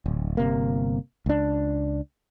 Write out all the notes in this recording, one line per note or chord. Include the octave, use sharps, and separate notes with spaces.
D1
G1 C3 A#3
C#2 D4